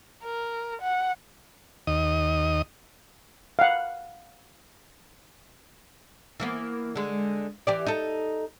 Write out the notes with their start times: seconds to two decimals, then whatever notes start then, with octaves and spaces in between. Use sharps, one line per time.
0.24 A#4
0.81 F#5
1.87 D#2 D#5
3.59 F5 F#5
6.40 E3 A#3 B3
6.95 D3 G#3
7.67 E3 G4 D5
7.86 D#4 A4